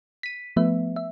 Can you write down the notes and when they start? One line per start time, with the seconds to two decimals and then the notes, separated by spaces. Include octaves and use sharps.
0.23 B6 D#7
0.56 F3 A3 B3 B4 E5
0.96 E5